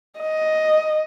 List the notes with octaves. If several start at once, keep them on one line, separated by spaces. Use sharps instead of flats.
D#5